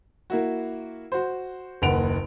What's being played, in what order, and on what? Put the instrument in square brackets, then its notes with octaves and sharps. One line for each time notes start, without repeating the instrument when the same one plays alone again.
[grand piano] A#3 E4 F#4
F#4 C5
F#1 D#2 B4 F#5 D7 F7